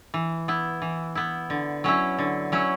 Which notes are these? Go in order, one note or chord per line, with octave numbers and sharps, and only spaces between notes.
E3
B3 E4
E3
B3 E4
D3
F#3 C#4 E4
D3
F#3 C#4 E4